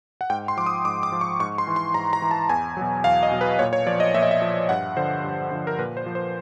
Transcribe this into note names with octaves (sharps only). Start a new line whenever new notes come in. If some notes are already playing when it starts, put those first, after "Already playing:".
F#5
G#2 G5
C6
F3 D6
D#6
G#2 D6
D6
F3
C#6
G#2 C#6
C6
E3
C6
G#2 A#5
A#5
E3
A5
E2 G#5
B2 F#3
E2 F5
D#5
B2 F#3
B4
A#2 C#5
C#5
F3 D5
D#5
A#2 E5
D#5
E5
F3
G2 F#5
D3 F3 C5
G2
D3 F3
A#4
A#2 B4
C5
F3
C5